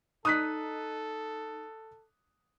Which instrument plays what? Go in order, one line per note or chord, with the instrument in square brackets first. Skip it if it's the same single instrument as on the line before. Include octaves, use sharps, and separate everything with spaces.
[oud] D#4 [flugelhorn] A4 [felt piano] D#6 F#6 B6